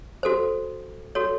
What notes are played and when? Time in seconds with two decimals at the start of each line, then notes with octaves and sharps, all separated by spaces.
0.23 F#4 A4 C5
1.15 F#4 A4 C#5